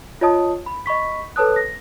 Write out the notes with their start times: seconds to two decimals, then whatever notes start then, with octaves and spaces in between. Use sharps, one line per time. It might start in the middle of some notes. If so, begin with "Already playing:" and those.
0.21 F4 C#5 D#5 A5 D#6
0.66 B5
0.86 D#5 B5 C#6 B6
1.36 A4 B4 C#5 A5 D#6 F#6
1.56 A#6